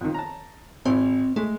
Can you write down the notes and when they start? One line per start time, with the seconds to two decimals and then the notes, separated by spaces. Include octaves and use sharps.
0.01 F2 D#3
0.14 A5 A#5
0.85 G#1 C4 E4
1.36 G#3 A3